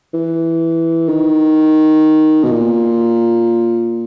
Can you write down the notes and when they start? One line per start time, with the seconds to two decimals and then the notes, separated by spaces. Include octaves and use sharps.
0.14 E3
1.09 D#3
2.44 B2
2.51 A#2